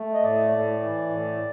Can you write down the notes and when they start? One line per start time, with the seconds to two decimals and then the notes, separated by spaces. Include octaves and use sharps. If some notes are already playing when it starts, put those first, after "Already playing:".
Already playing: A3
0.13 D#5
0.23 A2 D5
0.52 A2
0.81 E3
1.09 A2